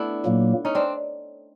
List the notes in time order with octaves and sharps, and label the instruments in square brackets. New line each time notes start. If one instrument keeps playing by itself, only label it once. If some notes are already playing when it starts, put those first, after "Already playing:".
Already playing: [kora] A3 B3 D4 E4
[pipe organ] A#2 F#3 A#3
[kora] C#4 D#4
C4 D4